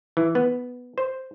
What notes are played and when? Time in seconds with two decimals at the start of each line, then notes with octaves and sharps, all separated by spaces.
0.17 E3
0.35 B3
0.98 C5